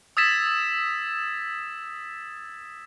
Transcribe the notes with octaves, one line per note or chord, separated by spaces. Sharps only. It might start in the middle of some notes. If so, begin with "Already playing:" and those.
D#6 E6 G#6 A6 B6 E7